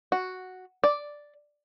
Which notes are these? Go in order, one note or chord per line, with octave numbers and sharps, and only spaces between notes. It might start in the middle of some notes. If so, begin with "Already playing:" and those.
F#4
D5